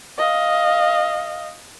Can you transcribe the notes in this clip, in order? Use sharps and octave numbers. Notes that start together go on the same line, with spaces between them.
D#5 F5